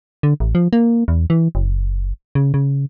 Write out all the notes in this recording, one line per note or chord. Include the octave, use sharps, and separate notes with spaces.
D3
A1
F3
A#3
E2
E3
F#1
C#3
C#3